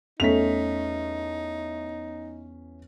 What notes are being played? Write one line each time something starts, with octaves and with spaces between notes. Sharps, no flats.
E2 A3 C#4 D#4 B6 F7